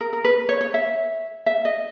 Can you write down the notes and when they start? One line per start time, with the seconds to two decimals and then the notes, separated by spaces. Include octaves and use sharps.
0.01 A#4
0.13 A#4
0.24 B4
0.49 C#5
0.61 C#5
0.74 E5
1.46 E5
1.65 D#5